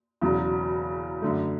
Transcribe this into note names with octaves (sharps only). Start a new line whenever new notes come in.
E1 E2 C#3 F#3
F#2 D3 A3